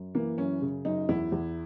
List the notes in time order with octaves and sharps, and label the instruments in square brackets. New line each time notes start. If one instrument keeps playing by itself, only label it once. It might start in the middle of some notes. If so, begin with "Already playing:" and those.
Already playing: [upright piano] F#2
E3 A#3
F#2 C#4
C#3
F#2 D#4
E2 E4
E2